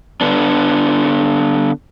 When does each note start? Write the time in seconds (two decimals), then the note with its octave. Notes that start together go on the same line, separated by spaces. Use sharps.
0.21 D3 B3 D4